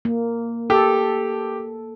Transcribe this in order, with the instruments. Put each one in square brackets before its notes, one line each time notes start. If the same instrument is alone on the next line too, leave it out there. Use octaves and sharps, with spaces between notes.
[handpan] A#3
[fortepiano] G4 [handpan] A4